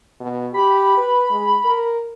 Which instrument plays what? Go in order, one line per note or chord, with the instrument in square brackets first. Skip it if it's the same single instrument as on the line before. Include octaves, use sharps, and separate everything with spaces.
[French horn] B2
[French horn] G4 [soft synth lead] B5
[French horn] B4
G#3
A#4